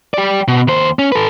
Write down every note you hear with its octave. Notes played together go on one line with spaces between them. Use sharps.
G4 D5
B2
D#2 C5
C#4
A4 B4